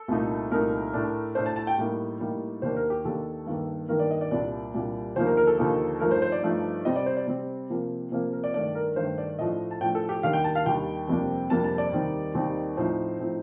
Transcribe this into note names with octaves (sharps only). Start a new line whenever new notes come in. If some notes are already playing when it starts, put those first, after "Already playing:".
Already playing: A4
C2 A#2 A3 D#4
C2 A#2 A3 D#4 A#4
A2 A3 D4
A2 A3 D4 C5
A5
A5
G5
A2 G3 A#3 D#4
A2 G3 A#3 D#4
D#2 D#3 A#3 D4 C5
A#4
G4
D#2 D#3 A#3 D4 A4
G2 D#3 A#3
G2 D#3 A#3 A#4
D5
D#5
D5
C2 A#2 G3 D4 D5
C2 A#2 G3 D4
D#2 D3 F3 A#3 D#4 C5
A#4
A#4
A4
D#2 D3 F3 A#3 D#4
G2 F3 A3 D#4 A#4
C5
C5
D5
G2 F3 A3 D#4
C3 G3 C4 D#5
D5
C5
D5
C3 G3 C4
C3 F3 A#3
C3 F3 A#3
A#4
D5
G2 D#3 A3 D4 D5
A#4
G2 D#3 A3 D4 C5
D5
A2 F3 A3 D4 D#5
A5
A2 F3 A3 D4 G5
A4
G4
D#2 D#3 G3 D4 F5
G5
A5
F5
D#2 D#3 G3 D4 G5
F2 C3 G3 A#3 D4
F2 C3 G3 A#3 D4 A5
A5
D5
D#2 D#3 G3 C4 D#4
D#2 D#3 G3 C4 D#4
A2 F3 C4 D#4 C5
A2 F3 C4 D#4